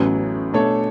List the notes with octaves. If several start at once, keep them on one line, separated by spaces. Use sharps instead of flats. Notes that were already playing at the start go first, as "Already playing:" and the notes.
Already playing: A1 A2 F#3 B3 C#4
B2 A3 D4 A4 C#5